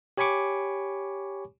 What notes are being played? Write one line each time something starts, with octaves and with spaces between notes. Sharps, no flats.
G4 C#5 G#5 B5 C#6 D6